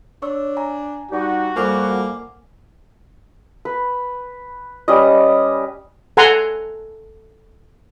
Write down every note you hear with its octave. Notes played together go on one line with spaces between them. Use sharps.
D4 C#5 C#6 E6
G#5 A#5
G3 D#4 F#4
F2 G3 A#3 F#5 G#5 D6
B4
G3 C#4 B4 D#5
A4 F#5 G#5 A#5 C6